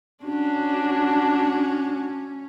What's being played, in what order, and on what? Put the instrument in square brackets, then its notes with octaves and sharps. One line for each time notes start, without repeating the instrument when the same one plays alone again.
[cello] C#4 [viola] D4 F#4